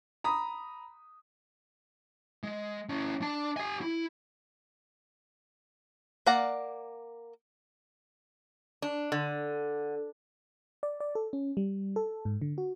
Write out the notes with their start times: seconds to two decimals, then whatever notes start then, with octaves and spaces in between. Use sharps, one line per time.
0.24 A#5 B5 D#6
2.43 G#3
2.89 C#4 E4
3.22 D4 A5
3.57 G4 G#5
3.81 E4
6.26 A#3 D5 F5 F#5 A#5
8.82 D4
9.12 D3
10.83 D5
11.00 D5
11.15 A4
11.33 C#4
11.57 G3
11.96 A4
12.25 G#2
12.42 D3
12.58 F#4